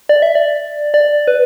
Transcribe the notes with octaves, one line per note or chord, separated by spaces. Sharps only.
D5
E5
D5
D5
B4